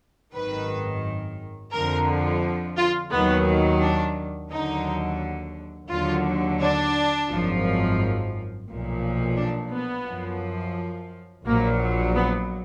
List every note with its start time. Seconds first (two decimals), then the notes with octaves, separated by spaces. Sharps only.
0.33 G#1 F#2 D#3 B4
1.72 F2 D3 F3 A#4
2.77 F4
3.11 D#2 D#3 F#3 B3
3.81 D4
4.50 D#2 D3 F#3 D#4
5.89 D#2 D3 F#3 F4
6.59 D4
7.28 G#1 F#2 F3
8.68 B1 A#2 F3
9.36 D4
9.71 B3
10.06 F#2 F3
11.45 A#1 A#2 F#3 A#3
12.14 B3